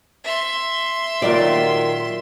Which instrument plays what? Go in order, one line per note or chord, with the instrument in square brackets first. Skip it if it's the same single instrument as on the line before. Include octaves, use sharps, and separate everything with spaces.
[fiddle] E5 C6
[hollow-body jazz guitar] A#2 F#3 G4 [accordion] D#3 [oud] F4 D5